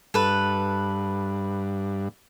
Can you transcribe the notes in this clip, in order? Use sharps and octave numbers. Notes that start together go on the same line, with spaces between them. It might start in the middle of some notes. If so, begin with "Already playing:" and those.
G2 A4 B4